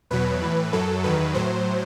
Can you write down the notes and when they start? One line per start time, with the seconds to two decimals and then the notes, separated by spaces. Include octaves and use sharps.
0.10 E2 B2 F#3 B4
0.42 A2 E3
0.73 F#2 F#3 A4
1.04 E2 D#3 F#3 B4
1.35 A2 F#3 C5